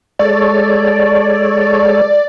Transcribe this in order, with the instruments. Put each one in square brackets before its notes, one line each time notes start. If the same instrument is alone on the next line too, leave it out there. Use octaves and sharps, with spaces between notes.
[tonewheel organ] G#3 A4 C#5 [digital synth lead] D5